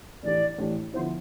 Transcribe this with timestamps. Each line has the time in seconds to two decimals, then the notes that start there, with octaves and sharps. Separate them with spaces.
0.23 A2 E3 A3 D4 G4 D5
0.58 A2 E3 A3 D4 G4
0.93 D3 F3 B3 E4 C5